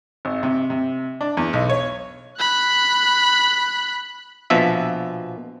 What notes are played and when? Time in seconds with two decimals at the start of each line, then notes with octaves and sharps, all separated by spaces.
0.25 G#1
0.43 C3
0.70 C3
1.21 D4
1.37 E2
1.53 B1
1.70 C#5
2.39 B5 F#6
4.50 A#1 B2 F3 E5